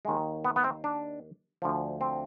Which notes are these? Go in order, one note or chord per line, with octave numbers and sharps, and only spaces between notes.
D#2 D#3 G#3
B3
B3
C4
D4
D2 D3 F3
C4